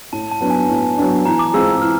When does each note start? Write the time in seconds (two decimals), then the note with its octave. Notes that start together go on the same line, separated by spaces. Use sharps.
0.13 A2 A5
0.31 A5
0.41 F#3 B3 D4
0.50 G#5
0.69 A2
0.98 F#3 B3 D4
1.26 E3 A#5
1.39 D6
1.54 G#3 C4 F4 G#4 E6
1.75 E6
1.82 E3 F6